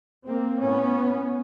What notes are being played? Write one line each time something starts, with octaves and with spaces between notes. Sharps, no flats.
A#3 C4
A2 B3 C#4